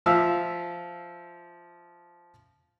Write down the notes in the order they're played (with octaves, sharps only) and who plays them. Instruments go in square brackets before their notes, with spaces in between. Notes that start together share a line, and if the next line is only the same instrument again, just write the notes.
[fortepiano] F3 E5 F5 E6